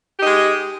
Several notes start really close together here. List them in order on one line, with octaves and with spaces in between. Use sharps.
G4 D#4 G#3